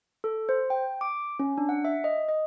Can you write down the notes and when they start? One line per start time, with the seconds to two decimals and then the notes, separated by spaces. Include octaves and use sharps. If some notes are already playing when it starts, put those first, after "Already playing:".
0.24 A4
0.49 C5
0.70 G5
1.01 D6
1.39 C#4
1.58 D4
1.69 F#5
1.85 E5
2.04 D#5
2.29 D#5